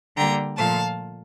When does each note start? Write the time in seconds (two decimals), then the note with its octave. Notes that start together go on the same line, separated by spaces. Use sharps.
0.17 D3 G3 A#3 G5 A#5
0.57 A#2 F3 A3 F5 A5